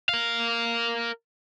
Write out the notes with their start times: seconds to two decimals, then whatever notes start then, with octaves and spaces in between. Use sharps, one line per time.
0.09 A#4 F5